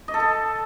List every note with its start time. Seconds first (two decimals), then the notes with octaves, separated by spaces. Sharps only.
0.08 D#5
0.14 A4
0.20 A5